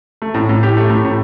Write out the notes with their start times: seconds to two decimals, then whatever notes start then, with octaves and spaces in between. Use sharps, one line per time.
0.22 A3
0.34 A2
0.49 A2
0.63 G4
0.77 A3
0.90 A2
1.05 A2